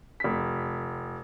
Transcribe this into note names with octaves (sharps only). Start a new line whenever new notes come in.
F1 B6